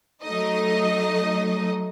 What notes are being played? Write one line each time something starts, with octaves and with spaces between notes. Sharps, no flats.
F#3 A3 D#4 D#5